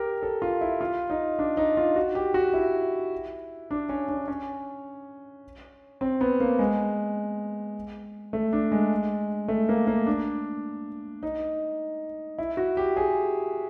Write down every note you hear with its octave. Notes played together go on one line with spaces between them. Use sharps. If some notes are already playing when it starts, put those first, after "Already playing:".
Already playing: G4 A#4
A4
F4
E4
F4
D#4
D4
D#4
F4
F#4
G4
F#4
E4
D4
C#4
D4
C#4
C4
B3
A#3
G#3
A3
D4
G#3
A3
A#3
A#3
D4
D#4
E4
F#4
G4
G#4